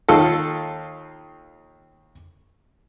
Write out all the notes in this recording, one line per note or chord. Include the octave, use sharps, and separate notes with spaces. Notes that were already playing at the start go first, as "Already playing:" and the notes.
D#2 F4 A4